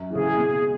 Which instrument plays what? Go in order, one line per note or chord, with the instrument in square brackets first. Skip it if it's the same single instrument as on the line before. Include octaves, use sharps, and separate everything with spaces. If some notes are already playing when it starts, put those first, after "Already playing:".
Already playing: [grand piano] F#2
[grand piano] C#3 E3 [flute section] G#4
[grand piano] B2
G#3